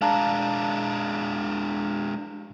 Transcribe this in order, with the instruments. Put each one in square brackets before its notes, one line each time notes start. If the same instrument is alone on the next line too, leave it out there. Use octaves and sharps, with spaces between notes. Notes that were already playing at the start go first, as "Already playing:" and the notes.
[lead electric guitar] G#3 D4 [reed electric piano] F5 A5 A#5